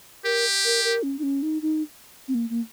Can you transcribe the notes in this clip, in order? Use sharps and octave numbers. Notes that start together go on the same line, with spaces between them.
G4 A#4
A#4
A#4
C#4
D#4
C#4
D#4
D#4
C4
A#3
A#3